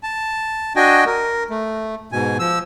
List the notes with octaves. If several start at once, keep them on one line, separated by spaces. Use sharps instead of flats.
A5
D4 F#4 D#5 G5 G#5
A#4
A3
G#2 B2 G#5
F3 E6